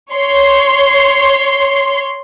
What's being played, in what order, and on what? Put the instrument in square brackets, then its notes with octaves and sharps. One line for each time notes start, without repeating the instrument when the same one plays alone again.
[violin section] C#5 C6